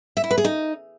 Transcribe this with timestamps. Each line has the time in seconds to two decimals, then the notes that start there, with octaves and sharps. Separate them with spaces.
0.17 E5
0.24 E4
0.31 B4
0.38 G#4
0.44 D#4